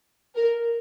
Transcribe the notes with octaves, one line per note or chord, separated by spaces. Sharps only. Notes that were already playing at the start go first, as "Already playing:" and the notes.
A#4